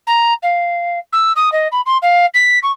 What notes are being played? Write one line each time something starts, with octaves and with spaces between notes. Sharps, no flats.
A#5
F5
E6
D#6
D#5
B5
C6
F5
B6
C#6